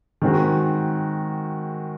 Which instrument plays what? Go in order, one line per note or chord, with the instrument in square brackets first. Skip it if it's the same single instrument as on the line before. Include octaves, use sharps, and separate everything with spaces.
[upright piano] D#3 G#3 C4 F#4